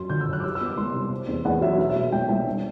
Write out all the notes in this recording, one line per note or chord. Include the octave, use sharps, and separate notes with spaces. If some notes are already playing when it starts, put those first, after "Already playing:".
Already playing: F#2 F#3 C6
D3 G6
E6
F#2
F#6
D6
G3 E6
E6
B3
D6
C2 C6
C3
C4
E2
E2 F#5
F#3 E5
B2 E5
E5
B2
E5
C2 G5
C2 G5
D4